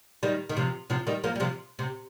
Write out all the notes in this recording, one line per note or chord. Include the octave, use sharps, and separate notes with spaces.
D#3 G3
D#3
C3 F3
C3 F3
D#3 G3
F3 A#3
G3
C3 F3
C3